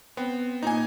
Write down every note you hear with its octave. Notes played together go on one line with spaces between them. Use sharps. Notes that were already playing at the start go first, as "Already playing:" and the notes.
B3 C4
A#2 D#4 G#5